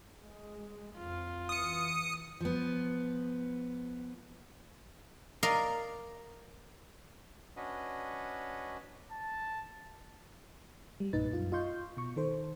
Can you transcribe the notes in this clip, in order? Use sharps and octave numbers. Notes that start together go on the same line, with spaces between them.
G#3
F2 F4
E3 D#6 C#7
F3 B3
A#4 D5 D#5 F5 A#5
C#4 D4 F#4 B4 D#5
A5
G3
B1 G2 A#2 D#4 B4 A6
F#2 F4
F4 D#5 F5 C6 C#6 G6
B2 C#6
D#3 A4 C5